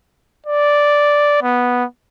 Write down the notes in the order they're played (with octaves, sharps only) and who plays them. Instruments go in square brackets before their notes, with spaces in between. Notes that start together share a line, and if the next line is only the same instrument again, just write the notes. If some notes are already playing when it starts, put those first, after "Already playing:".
[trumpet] D5
B3